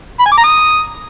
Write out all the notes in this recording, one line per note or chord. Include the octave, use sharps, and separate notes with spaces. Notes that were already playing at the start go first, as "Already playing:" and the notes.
B5
G#5
D6
A#5
D#6